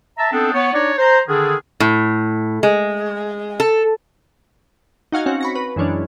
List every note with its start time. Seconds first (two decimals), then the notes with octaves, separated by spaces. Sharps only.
0.17 E5 A5 A#5
0.32 B3 C4 D4 D#4 A4
0.52 B3 C#5
0.72 D4 D#4 C#5 D5
0.97 C5 A#5
1.28 D3 D#3 D4 G#4
1.80 A2
2.63 G#3
3.60 A4
5.12 D#4 F#4 F5 G#5
5.26 C4 C#4 F#4
5.41 B5 C#6 A#6
5.55 B4
5.76 F#2 E3 G#3 C#4 D4